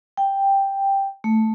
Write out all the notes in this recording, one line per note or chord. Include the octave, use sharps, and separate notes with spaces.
G5
A3